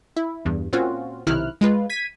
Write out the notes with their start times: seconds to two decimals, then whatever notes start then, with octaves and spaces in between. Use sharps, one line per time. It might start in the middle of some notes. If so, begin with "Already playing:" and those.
0.16 E4
0.45 E2 G2
0.73 A#2 C4 C#4 F4 F#4
1.27 B1 C3 D#3 E4 F6 F#6
1.61 G#3 F4 B4
1.90 G#6 B6 D#7